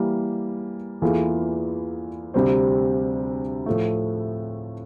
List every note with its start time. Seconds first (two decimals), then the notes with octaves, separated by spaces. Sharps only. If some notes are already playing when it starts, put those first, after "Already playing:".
Already playing: E3 G3 A#3
1.02 E2 E3 A#3 F4 A4
2.34 D2 C3 G3 C4
3.66 A2 F3 A3